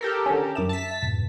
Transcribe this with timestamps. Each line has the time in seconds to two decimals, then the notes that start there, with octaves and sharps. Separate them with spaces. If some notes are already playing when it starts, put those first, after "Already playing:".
0.01 G4 A4 A#4
0.26 D3 C#4
0.55 F#2 E5 D6 E7
0.69 A5 B6
1.02 F2 G#2 B2